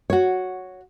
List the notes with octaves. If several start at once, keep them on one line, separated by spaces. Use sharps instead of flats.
F#4 C#5